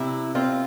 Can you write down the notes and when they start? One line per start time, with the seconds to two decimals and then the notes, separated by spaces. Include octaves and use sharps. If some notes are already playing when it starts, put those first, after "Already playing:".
Already playing: C3 E4
0.35 C4 F4